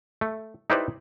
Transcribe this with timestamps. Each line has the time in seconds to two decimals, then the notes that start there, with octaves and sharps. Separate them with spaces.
0.21 A3
0.70 D#4 E4 G4 B4 C5 D5